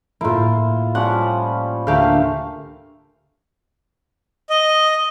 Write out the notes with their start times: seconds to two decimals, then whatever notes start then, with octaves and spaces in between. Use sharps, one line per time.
0.21 A2 A#3 E4 F4
0.95 F3 G3 C#4 F#5
1.87 D2 A3 A#3 G4 F5
4.50 D#5